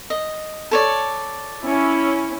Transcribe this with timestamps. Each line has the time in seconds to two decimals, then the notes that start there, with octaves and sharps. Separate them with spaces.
0.10 D#5
0.71 A4 C#5 D5
1.62 C#4 E4